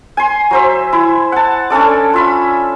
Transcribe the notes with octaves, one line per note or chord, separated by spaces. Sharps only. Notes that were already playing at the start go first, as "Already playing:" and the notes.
G#5 C6
F#3 C5 E5
E4
F#5 A5
C#4 D4 A4 D5
F4 E5 B5